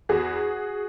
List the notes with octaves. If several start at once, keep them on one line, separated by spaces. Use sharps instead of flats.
E2 F#4 G#4